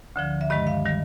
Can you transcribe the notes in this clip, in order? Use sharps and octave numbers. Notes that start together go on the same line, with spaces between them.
D2 D3 F3
E5
G2 D#3 G#3 D#5
F5
D#3 G3